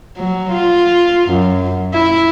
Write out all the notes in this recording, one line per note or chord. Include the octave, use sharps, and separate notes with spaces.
F#3
F4
F#2
E4